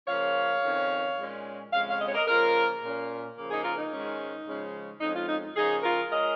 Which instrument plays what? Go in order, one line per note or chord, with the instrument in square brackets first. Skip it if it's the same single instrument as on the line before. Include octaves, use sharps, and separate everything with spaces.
[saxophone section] C#3 F3 A#3 C#4 C#5 F5
F2 D#3 C#4
A#2 G#3 C#4
F2 C#3 G#3 C#4 F5
C#5 F5
D#5
C#5
A#4 D#5
C#3 F3 A#3 C#4 F4 A#4
A#2 A#3 C#4
C#3 F3 A#3
D#4 G#4
F4 A#4
D#4
G#2 D#3 G#3 C#4
C#3 F3 G#3 C#4
F2 F3 G#3 C#4 D#4
F4
D#4
C#3 F3 A#3 C#4 D#4 G#4
F4 A#4
G#3 C#4 A#4 D#5